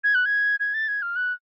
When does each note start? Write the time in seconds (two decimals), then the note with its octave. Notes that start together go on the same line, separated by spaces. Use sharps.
0.04 G#6
0.15 F#6
0.26 G#6
0.60 G#6
0.74 A6
0.88 G#6
1.02 F6
1.16 F#6